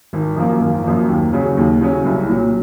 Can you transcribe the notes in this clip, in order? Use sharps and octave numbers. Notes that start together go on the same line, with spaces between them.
G#1
F#2 F3 A#3
G#1
F#2 F3 A#3
D#2
C#3 F#3 C#4
D#2
C#3 F#3 C#4
C2
A#2 F#3